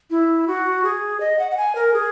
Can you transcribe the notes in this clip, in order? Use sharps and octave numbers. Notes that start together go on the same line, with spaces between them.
E4
F#4
G#4
D#5
F#5
F#5
G#5
A#4
G#4